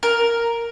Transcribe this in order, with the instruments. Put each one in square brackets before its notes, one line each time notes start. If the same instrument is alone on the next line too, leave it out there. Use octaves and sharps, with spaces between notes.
[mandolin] A#4